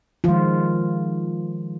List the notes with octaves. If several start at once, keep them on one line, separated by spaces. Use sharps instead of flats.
D#3 F3 G#3 F4